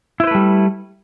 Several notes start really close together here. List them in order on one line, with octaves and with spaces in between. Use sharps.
E4 C5 B4 A3 G3